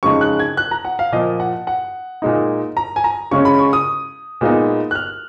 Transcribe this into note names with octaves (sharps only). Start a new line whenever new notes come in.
F2 C#3 G#3 D#4 C#6
F#6
G#6
F#6
A#5
F#5
F5
A#2 F3 A#3 D#5
F#5
F#5
A#2 G#3 D#4
A#5
G#5
A#5
C#3 G#3 C#4 C#6
B5
C#6
D#6
A#2 G#3 B3 D#4
F#6
F6